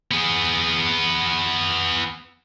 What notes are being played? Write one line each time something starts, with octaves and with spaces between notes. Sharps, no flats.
B3 G#4